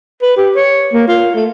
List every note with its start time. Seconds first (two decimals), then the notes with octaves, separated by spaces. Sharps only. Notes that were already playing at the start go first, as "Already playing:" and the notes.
0.22 B4
0.37 G4
0.56 C#5
0.93 A#3
1.08 F4
1.35 A3